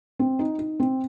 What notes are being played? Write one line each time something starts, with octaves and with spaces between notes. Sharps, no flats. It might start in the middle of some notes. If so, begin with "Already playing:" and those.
C4
D#4
D#4
C4